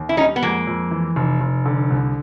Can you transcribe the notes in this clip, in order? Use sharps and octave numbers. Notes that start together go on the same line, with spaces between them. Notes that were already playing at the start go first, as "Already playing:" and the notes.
Already playing: D#2
E4
G3 C#4 D#4
B3
F2 G#3 A#3
F2
E3
F1
F1
D3
C2